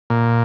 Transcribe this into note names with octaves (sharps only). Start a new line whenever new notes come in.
A#2